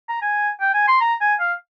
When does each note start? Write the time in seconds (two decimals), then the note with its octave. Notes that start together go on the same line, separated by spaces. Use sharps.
0.09 A#5
0.22 G#5
0.61 G5
0.74 G#5
0.88 C6
1.01 A#5
1.21 G#5
1.40 F5